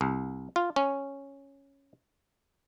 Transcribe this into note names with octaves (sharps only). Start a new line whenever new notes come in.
C2
F4
C#4